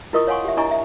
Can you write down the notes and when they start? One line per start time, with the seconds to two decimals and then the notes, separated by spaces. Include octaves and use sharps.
0.13 E4 F4 A#4 D#5 C#6 D#6
0.27 C#5 F5 F#5 G#5 C6 C#6
0.44 G4 E5
0.57 D4 E4 D#5 G#5 A#5 C#6
0.71 E5